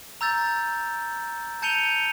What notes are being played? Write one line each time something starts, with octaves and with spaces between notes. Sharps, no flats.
A#5 E6 G6 A6
A5 G6 C#7 D#7 F7 G7